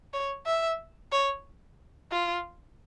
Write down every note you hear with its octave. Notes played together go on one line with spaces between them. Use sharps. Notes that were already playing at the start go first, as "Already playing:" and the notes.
C#5
E5
C#5
F4